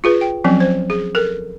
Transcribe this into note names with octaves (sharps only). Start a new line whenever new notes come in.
F4 G#4 B4
G5
F3 F#3 C4 C#4
C5
G#4
A4 A#4